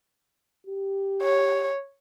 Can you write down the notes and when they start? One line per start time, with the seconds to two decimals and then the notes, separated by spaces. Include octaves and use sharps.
0.67 G4
1.23 C#5